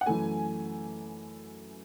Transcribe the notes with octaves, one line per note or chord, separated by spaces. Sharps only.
F#5
F#2 E3 A3 G#5